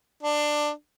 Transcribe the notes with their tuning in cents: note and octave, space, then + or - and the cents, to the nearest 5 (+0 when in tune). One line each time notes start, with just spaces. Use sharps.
D4 +15